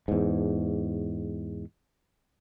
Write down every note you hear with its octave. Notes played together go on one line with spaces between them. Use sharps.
E2 G#2